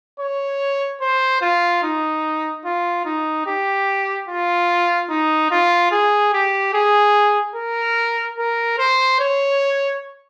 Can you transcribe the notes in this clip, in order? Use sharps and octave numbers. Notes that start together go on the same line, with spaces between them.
C#5
C5
F4
D#4
F4
D#4
G4
F4
D#4
F4
G#4
G4
G#4
A#4
A#4
C5
C#5